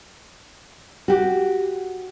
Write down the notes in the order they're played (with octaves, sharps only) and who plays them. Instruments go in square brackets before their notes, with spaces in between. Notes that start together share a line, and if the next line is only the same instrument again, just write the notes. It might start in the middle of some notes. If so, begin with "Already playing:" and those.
[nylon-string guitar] F#4 G4